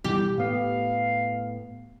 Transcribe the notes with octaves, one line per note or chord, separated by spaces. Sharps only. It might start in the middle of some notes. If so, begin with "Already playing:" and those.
B2 E3 G3 G4
A2 B3 F5